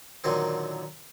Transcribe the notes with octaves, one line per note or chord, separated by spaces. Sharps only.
A#2 D3 D#3 F#3 C4